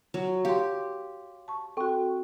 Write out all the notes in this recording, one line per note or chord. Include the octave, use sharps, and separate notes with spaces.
F#3 F#4
G4 F5 C6
A5 C#6
C4 F#4 A4 G5 C#6